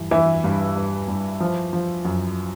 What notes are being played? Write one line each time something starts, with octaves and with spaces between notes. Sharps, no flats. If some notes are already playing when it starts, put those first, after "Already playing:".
Already playing: G2 E3
E3 E4
G2
G2
G2
F3
F3
F#2